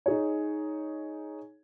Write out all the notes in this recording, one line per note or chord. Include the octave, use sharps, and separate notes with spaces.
D#4 G#4 C#5